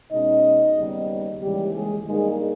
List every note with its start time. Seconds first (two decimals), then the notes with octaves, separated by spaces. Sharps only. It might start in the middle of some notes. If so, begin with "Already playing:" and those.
0.11 B2 G#3 C#4 D#4 D#5
0.77 D#2 C#3 G3 B3
1.42 D#2 C#3 E3 G3 G#3 G4
1.75 G#3 G#4
2.07 G2 D#3 G#3 A#3 D#4 G#4